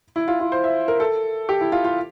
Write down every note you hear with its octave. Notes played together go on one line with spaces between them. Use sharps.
E4
F4
F4
C5
E5
A#4
A4
G4
E4
F4
F4